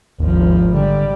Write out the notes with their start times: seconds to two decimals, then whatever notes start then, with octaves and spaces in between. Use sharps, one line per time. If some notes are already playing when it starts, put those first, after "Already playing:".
0.20 G#1 D#2 F3
0.73 D3 G3